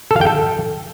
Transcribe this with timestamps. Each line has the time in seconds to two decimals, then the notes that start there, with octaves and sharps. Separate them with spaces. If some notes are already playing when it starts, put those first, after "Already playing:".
0.11 A4
0.16 F5
0.21 G5
0.27 A4